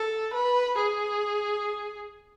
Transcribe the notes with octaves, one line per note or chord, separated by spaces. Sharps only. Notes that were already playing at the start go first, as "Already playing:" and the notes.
Already playing: A4
B4
G#4